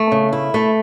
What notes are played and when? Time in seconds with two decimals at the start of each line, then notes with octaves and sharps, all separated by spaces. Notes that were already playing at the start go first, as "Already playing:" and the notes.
Already playing: A3
0.12 C#3
0.33 E4
0.54 A3